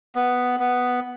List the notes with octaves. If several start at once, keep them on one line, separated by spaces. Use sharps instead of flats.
B3
B3